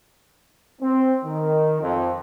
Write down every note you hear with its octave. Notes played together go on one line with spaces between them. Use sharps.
C4
D#3
F2